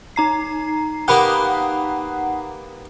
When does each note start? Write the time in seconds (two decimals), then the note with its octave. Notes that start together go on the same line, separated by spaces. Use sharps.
0.16 D#4 A#5 C7
1.08 A#3 B3 G4 F#5 B5 D#6